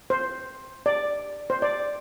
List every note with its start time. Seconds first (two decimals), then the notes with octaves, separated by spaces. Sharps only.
0.10 C5
0.86 D5
1.50 C5
1.62 D5